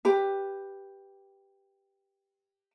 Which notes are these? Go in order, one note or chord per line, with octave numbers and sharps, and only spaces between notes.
G4 B4